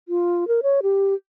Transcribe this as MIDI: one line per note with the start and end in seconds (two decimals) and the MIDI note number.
0.08 0.47 65
0.48 0.61 70
0.63 0.80 73
0.83 1.14 67